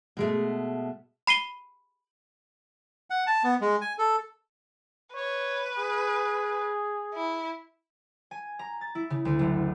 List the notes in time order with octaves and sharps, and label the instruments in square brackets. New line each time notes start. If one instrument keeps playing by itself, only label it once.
[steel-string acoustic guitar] B2 G#3 A3
[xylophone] B5 C7 D#7 G7
[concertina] F#5
A5
B3
G#3
G#5
A4
[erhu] B4 [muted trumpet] C#5
[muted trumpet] G#4
[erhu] E4
[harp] G#5
A#5
A6
E4
C#3
D2
F#1